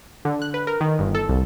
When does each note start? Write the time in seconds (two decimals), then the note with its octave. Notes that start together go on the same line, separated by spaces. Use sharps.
0.25 D3
0.42 F#6
0.54 B4
0.67 A#4
0.81 D#3
0.99 G1
1.15 A4
1.29 C2